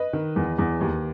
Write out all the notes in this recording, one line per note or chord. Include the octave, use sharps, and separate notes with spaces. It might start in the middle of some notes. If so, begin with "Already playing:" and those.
Already playing: B4 D#5
D#3
E2
E2
D#2